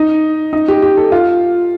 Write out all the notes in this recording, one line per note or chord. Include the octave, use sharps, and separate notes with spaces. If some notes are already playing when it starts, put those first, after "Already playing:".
Already playing: D#4
D#4
G4
G4
A4
F4